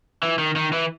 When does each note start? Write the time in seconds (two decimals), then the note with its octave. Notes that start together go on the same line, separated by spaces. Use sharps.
0.23 E3
0.38 D#3
0.56 D#3
0.73 E3